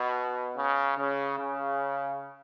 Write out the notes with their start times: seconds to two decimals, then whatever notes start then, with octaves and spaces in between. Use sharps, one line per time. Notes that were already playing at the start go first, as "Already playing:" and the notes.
Already playing: B2
0.56 C#3
0.97 C#3
1.38 C#3